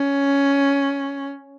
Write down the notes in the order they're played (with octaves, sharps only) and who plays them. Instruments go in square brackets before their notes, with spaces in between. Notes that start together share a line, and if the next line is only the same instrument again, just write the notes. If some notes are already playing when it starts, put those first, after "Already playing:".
Already playing: [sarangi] C#4